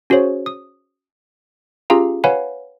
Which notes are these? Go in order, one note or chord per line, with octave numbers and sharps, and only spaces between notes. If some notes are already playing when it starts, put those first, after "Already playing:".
C#4 F#4 G#4 C5 C#5
D#6
C#4 F4 G4 G#4 F5 A#5
B4 C#5 F5 F#5 G#5 B5